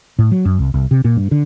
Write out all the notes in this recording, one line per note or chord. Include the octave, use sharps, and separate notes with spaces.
A2
F#3
F#2
C2
C2
C3
A#2
G2
D3